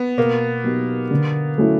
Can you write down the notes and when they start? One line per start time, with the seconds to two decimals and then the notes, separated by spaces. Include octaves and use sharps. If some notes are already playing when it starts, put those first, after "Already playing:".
Already playing: B3
0.17 B2 A#3
0.64 F#3 B3 D#4 G4
1.11 D3
1.58 F#3 A3 C#4 E4